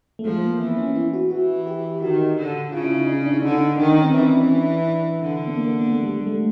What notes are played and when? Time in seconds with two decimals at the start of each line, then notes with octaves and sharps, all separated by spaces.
0.19 A3
0.25 F3 G#3
0.43 A#3
0.60 E3 B3
0.78 C#4
0.96 E4
1.13 F#4
1.31 E3 F#4
1.67 G4
2.02 D#3 F#4
2.38 D3
2.72 C#3 F4
2.84 E4
2.96 D#4
3.08 D4
3.26 D4
3.34 D#4
3.42 D3 D4
3.49 D#4
3.58 D4
3.79 D#3 D#4
3.91 C#4
4.02 C4
4.14 E3 D4
4.43 C#4
4.50 D4
4.73 D4
5.21 D3
5.47 B3
5.55 A#3
5.68 B3
5.79 A#3
5.91 A3
6.03 G3
6.14 G#3
6.27 A3